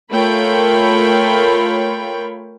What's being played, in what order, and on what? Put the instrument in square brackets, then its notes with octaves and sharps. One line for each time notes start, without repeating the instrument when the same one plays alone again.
[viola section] A3 F4 A#4 C#5 G5 B5